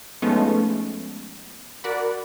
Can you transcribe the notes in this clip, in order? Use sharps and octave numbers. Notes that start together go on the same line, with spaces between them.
F3 G#3 A3 B3 C#4 D#4
F#4 A#4 D5 F#5 B5